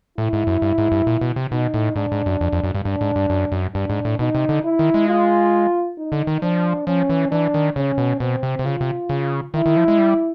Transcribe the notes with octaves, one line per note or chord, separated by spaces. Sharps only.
A2 E4
G#2
F#2
G2
G#2
G2
A#2
B2
C3
B2 D#4
A2
G#2 D4
G#2
F#2
F2
F2
F#2
G2
G2 D4
G#2
G2
F#2
F#2
G2 D4
G#2
A2
B2 D#4
C3
D3
E4
D#3
G#3
F4
D#4
D3
D#3
F3 D4
F3 C#4
E3
E3 D4
D#3
C#3 C#4
B2
B2 C4
C3
C3
C#3 F4
C3
C#3
D#3 E4
D#3
F3
G#3
G3